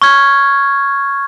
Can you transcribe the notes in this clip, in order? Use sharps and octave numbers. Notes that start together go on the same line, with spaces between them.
C#6 F6 G#6